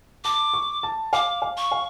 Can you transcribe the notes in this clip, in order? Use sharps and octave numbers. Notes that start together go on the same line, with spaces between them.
A5 D6
C#6
A5
F5 D6
F5
C#6
F5